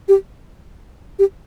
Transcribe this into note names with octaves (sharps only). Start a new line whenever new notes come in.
G4
G4